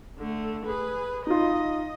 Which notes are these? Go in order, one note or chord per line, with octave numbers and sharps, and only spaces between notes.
D3 A3
G#4 B4
D#4 F4 D#5